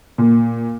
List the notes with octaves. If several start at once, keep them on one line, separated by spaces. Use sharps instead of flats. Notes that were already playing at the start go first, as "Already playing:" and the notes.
A#2